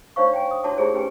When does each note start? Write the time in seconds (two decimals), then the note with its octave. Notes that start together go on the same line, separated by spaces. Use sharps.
0.16 D4 D#4 C5 C#5 F5 C#6
0.33 G5 G#5
0.51 D#6
0.64 D4 E4 F#4 C#5 A5 D6
0.77 D#4 E4 G4 G#4 C5
0.94 C#4 G4 B4 G#5